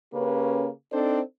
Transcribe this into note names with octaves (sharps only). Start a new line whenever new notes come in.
C#3 A#3 C#4 G4 B4
C4 D4 D#4 A4 C5 D5